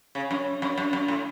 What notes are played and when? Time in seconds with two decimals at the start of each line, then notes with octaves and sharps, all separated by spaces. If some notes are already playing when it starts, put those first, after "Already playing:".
0.15 C#3
0.31 F#2
0.62 F#2
0.78 F#2
0.93 F#2
1.08 A2